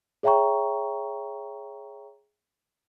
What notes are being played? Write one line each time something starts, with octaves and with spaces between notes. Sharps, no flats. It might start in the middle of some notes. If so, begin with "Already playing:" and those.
G#4 C#5 E5 G5 A#5 C#6